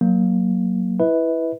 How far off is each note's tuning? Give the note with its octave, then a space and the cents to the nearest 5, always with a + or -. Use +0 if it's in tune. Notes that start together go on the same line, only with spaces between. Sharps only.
F#3 +0 A#3 +0
E4 +0 B4 +0 E5 -40